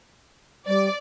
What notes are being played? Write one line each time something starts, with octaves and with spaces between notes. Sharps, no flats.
G3 D5